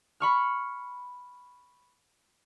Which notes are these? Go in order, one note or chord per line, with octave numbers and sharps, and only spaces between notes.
B5 C#6 F6